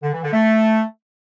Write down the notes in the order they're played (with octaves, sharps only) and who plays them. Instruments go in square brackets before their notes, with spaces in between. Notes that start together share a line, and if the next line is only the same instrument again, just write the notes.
[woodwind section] D3
E3
D3
A3